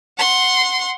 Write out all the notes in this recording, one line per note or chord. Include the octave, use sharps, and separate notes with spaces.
F#5 C6